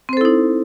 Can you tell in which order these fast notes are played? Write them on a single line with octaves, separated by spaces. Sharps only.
C4 C5 A4 E4 D#4